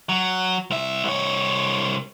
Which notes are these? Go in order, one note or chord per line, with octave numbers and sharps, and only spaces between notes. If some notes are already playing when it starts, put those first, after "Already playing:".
F#3
C2 E5
C2 C#5